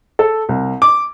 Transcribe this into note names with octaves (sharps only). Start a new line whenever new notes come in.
A4
C2
D6